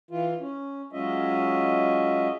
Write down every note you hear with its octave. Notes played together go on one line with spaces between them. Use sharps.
E3 F4
C#4
F#3 G#3 C#4 F4 D#5 E5